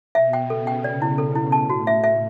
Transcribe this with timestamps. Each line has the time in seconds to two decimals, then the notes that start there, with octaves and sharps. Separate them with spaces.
0.15 B2 E5
0.33 G5
0.49 C#3 A4
0.67 G5
0.84 D5
1.02 E4
1.18 B2 A4
1.35 E4
1.52 A2 A5
1.70 F#4
1.87 E5
2.04 E5